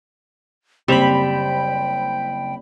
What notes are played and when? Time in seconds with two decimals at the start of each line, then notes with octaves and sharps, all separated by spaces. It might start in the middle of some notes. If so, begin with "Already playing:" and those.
0.88 F#1 G3 C4 C5 G5 B5 E7 F7